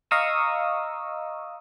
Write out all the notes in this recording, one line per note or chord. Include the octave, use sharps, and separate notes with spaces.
D#5 F5 A#5 C#6 D#6 E6